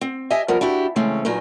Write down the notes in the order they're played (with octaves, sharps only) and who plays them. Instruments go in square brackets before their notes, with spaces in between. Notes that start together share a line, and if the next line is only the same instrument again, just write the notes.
[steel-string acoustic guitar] C4
G4 D#5 E5 G#5 A5
F3 G3 B3 A#4
D4 E4 F#4 G4
C#3 E3 G#3 A3 C4 C#4
G2 A#2 F#3 D#4 G#5